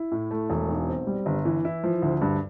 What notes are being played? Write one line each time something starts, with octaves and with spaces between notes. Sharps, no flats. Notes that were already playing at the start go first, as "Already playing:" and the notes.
Already playing: E4
A2
A3
E1
B1
C4
G3
G1
E3
E4
F3
D2
G2